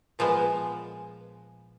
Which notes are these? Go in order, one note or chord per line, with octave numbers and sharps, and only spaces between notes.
A#2 F3 G#3 B3